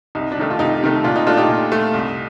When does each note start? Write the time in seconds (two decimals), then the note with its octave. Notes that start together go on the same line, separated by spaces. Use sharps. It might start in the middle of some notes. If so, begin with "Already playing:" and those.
0.15 C2 D#4
0.32 D4
0.37 C3 D#3 A3 D#4
0.50 F4
0.59 C2 D#4 G4
0.82 C3 D#3 A3
1.04 A#2 D4 F4
1.16 D#4
1.27 A3 D4 F4
1.37 D#4 G4
1.49 A#2
1.72 A3
1.94 C2